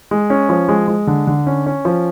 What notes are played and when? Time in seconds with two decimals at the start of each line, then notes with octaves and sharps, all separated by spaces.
0.11 G#3
0.30 C#4
0.49 F3
0.69 G#3
0.88 G#3
1.07 D3
1.27 D3
1.47 C#4
1.66 C#4
1.85 F3